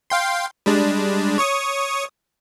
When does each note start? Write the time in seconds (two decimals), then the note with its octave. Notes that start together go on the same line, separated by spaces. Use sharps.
0.10 F5 G5 C6
0.66 G3 G#3 D4
1.38 C#5 C#6 D#6